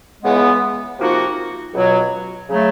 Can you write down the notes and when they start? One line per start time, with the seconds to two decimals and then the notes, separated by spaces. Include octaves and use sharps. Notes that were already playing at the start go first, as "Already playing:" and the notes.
0.23 C#2 C#3 E3 G#3 B3
0.99 C3 F3 A#3 D#4 F#4
1.74 C#2 B2 F#3
2.49 C#3 F#3 A3